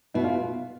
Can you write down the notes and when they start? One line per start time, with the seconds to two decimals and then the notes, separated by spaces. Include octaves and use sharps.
0.14 B2 E4
0.24 F4